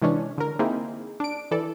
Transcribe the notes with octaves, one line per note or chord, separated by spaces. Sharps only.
C3 E3 G#3 C#4 D4
D3 A#4
A#3 C4 D#4 E4 G#4
D4 D7
E3 A4 D5